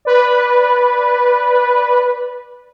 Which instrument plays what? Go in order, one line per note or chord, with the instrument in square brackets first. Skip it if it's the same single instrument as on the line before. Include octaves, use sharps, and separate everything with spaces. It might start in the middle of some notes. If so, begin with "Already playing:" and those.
[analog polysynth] B4 D5